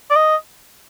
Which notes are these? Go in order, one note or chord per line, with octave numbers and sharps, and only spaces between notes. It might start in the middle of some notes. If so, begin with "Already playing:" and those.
D5
D#5